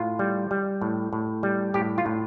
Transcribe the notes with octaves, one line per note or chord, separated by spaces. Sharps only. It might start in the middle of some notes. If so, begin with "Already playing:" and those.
Already playing: A2 F4
G3
G3
A2
A2
G3
A2 G4
F4
A2